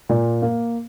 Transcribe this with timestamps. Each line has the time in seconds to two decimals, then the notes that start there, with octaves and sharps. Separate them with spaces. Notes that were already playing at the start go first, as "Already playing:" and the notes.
0.09 A#2
0.42 A#3